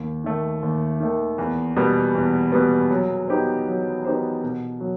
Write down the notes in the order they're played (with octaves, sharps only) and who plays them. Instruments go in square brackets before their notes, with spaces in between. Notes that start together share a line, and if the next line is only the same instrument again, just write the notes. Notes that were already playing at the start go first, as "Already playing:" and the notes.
Already playing: [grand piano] D#2
D#3 A3
D#2
D#3 A3
E2
B2 G3 B3
E2
B2 G3 B3
F#3
B3 D#4 G4 C5
F#3
B3 D#4 G4 C5
B2
F#3